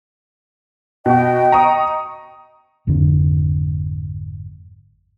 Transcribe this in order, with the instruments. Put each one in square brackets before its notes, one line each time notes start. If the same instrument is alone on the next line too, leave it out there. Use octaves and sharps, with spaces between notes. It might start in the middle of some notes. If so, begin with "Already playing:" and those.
[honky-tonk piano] B2 F#4 [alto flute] D#5 [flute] G5
[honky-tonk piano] A#5 C#6 D#6
[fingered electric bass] G#1 F2 G#2 D3